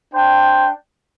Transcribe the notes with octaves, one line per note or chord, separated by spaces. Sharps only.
D4 C5 G5